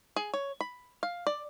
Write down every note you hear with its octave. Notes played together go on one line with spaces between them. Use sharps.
G#4
C#5
B5
F5
D5